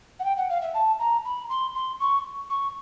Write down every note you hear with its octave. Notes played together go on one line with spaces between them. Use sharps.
F#5
G5
F#5
F5
E5
A5
A#5
B5
C6
C6
C#6
C#6